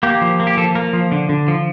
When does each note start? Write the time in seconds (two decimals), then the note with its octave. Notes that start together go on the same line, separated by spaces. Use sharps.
0.03 A#3 G4
0.21 F3
0.40 A#3
0.47 G4
0.57 F3 A4
0.75 A#3 A#4
0.93 F3
1.12 D3
1.29 D3
1.48 F3